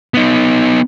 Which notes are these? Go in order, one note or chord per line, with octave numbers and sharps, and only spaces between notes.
B3 D#4